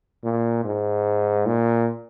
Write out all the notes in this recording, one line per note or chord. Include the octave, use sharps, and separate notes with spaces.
A#2
G#2
A#2